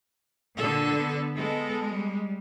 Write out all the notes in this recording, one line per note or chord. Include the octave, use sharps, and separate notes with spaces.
A#2 D3 A4
B3
G#3 B3 A4
G3